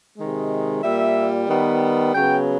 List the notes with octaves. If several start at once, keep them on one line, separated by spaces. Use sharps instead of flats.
C3 D#3 G#3
A#2 G3 A#3 E5
D#3 G3 B3
C#3 F#3 B3 G5